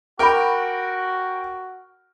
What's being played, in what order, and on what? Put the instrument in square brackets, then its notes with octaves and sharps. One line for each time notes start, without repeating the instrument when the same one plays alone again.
[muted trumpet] F#4 [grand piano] A#4 G5 [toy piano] B5 D6